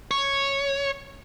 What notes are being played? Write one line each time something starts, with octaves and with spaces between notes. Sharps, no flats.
C#5